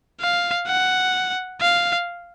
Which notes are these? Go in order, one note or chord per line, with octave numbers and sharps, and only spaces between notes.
F5
F#5
F5